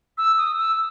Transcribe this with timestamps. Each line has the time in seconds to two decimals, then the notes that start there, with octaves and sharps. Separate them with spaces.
0.18 E6
0.38 D#6
0.58 E6